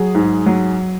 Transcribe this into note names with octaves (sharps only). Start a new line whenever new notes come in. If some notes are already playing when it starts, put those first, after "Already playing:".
Already playing: F#3 G#4
G#2
F#3